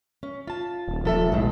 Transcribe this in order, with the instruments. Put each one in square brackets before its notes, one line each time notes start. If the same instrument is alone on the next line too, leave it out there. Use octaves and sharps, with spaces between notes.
[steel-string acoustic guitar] C#4
F4 A5
[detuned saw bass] D#1
[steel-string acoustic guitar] F3 A4 E5
[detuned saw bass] B1 [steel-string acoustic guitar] A2 G#3